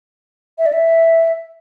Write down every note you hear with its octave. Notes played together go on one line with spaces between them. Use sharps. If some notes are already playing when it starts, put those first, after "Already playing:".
E5
D5
E5